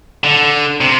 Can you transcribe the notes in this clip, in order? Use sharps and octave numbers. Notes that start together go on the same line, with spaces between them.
D3
C3